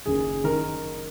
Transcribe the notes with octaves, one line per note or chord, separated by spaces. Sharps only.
F#1 F#2 D#3 G#4
D#3 A#4